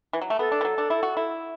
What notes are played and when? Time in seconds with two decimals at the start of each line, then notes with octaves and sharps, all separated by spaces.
0.13 E3
0.21 F#3
0.30 A3
0.39 B3 A4
0.52 D4
0.61 E3
0.65 F#3
0.78 D4
0.90 E4
1.03 F#4
1.17 E4